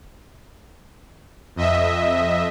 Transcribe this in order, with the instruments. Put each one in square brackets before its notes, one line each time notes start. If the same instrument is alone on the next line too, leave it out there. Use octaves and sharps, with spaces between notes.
[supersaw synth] F2 D#5 E5